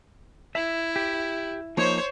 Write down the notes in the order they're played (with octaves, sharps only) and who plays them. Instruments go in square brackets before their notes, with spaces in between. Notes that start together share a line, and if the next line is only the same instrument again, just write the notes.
[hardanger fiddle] E4 [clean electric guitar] E5
[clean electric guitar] G4
[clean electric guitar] F3 A#3 D#4 [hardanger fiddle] C5 C#5